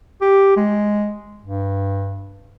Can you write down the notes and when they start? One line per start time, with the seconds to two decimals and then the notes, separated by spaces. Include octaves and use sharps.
0.21 G4
0.57 G#3
1.42 G2